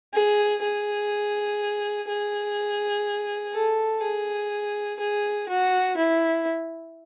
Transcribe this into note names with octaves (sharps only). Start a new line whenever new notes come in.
G#4
G#4
G#4
A4
G#4
G#4
F#4
E4